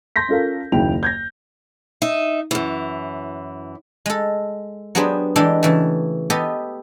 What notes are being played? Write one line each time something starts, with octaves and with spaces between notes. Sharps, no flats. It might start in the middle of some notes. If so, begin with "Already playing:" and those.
C6 G6 A#6 B6
C#4 F4 A4 A#4 F5
F#1 D#2 C#3 E4 G5 F7
G6 G#6 A#6
D#4 E5
F#2 E3
G#3 A4
F#3 B3 D4 G4 G#4 C5
E3 G#3 D4 G4 A4
C#3 E3 A3
B3 G4 A4 B4 D#5